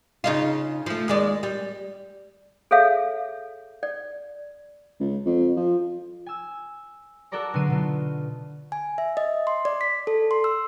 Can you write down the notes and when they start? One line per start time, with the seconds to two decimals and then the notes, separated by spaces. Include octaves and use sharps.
0.24 C#3 D#4 F4
0.86 F3 A3
1.08 D#2 G#3 D5
1.43 G3
2.71 G#4 A4 C#5 E5 F5
3.83 D5
5.00 C#2
5.26 F2
5.56 F3
6.26 G#5 E6
7.31 F#4 A4 A#4 D5 A#5 C#6
7.53 B2 D3 F#3 C#6 C7 D#7
7.70 B2 F4
8.72 G#5
8.98 E5
9.17 D#5
9.47 C6
9.65 D5
9.81 B6
10.07 A4
10.31 C6
10.44 E6